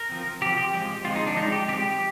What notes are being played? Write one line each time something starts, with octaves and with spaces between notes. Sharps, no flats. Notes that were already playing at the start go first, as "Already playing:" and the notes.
Already playing: A#4
F3 C4
F3 C4 G4
G4
F3 G#3 C4
F3 G#3 C4 F4
D#4
D4
F3 G#3 C4 D#4
G4
F3 G#3 C4 G4